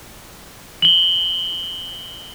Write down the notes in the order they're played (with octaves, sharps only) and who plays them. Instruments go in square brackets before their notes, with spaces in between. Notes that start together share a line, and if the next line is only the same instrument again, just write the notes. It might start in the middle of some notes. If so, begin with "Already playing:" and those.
[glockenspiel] F#7 G7